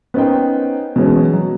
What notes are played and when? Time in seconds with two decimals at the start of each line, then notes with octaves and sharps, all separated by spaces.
0.14 B3 C#4 D#4 A#4 C5 G5
0.96 B2 E3 F#3 G#3 B3 C#4
1.33 F#3